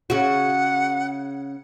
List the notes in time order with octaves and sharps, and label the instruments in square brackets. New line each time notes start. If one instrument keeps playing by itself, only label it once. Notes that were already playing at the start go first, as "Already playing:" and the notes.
[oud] C#3 F#4 [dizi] F#5